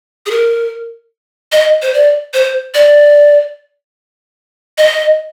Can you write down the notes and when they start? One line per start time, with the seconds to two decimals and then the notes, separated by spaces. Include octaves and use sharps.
0.26 G#4
0.31 A#4
1.52 D#5
1.82 C5
1.94 D5
2.34 C5
2.74 D5
4.78 D#5